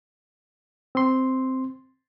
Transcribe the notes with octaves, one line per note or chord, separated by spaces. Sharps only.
C4 C6